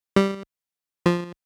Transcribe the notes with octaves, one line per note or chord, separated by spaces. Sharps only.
G3
F3